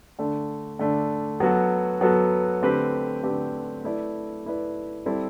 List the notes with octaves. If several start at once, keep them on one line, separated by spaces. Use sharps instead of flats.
D3 A3 D4
D3 A3 D4
F#3 B3 F#4 A4
F#3 B3 F#4 A4
D3 A3 C4 G4 B4
D3 A3 C4 G4 B4
A3 E4 B4 D5
A3 E4 B4 D5
G3 C4 E4 A4 D5